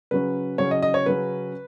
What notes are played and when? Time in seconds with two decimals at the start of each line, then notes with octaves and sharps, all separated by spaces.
0.11 C#3 F#3 C#4 B4
0.58 C#3 F#3 C#4 C#5
0.71 D#5
0.82 D#5
0.94 C#5
1.06 C#3 F#3 C#4 B4